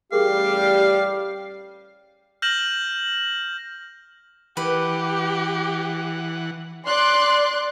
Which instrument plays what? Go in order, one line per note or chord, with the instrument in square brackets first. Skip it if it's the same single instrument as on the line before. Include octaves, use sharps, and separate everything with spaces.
[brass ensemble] A1 G3 [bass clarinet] G4 [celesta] G#4 A#4 [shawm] F5
[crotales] F6 G6 A#6 E7 F#7
[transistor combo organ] E3 F#5 [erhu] G4 [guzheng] B4
[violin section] D5 C6 F#6